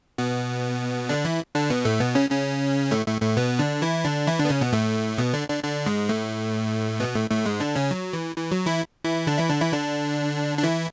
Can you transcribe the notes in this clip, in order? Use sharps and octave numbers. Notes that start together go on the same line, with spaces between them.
B2 B3
D3 D4
E3 E4
D3 D4
B2 B3
A2 A3
B2 B3
C#3 C#4
C#3 C#4
A2 A3
A2 A3
A2 A3
B2 B3
D3 D4
E3 E4
D3 D4
E3 E4
D3 D4
B3
C#3 C#4
B2 B3
A2 A3
B2 B3
D3 D4
D3 D4
D3 D4
G#2 G#3
A2 A3
B2 B3
A2 A3
A2 A3
G#2 G#3
D3 D4
C#3 C#4
F#3
E3
E3
F#3
E3 E4
E3 E4
D3 D4
E3 E4
D3 D4
E3 E4
D3 D4
D4
E3 E4